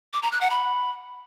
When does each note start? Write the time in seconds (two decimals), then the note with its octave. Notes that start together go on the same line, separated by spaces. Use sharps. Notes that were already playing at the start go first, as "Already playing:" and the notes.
0.13 D6
0.23 A#5
0.32 F#6
0.41 F#5
0.50 B5